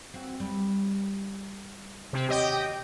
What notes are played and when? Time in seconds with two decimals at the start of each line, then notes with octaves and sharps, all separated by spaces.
0.14 C4 F#4
0.40 G3
2.13 C3 C4
2.29 D#2 B2 G4 C#5 D#5 G5